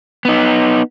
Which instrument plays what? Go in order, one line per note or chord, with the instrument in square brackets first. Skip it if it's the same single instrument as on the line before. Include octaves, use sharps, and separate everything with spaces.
[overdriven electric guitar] B3 D#4